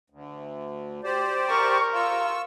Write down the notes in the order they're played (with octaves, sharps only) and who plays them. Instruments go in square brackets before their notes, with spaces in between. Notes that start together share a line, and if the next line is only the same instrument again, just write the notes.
[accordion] D2
G4 C5 D5
[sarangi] A#4 [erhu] C#6
[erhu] F4 [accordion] C#6 E6